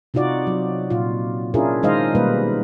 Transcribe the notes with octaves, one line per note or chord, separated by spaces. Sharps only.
C3 D#4 F4 F#4 D5
F#3
A#2 F4
C#4 D4 E4 F4 G#4 A#4
D#3 G#3 D#4 C5 D#5 F5
B2 G3 A#3 B4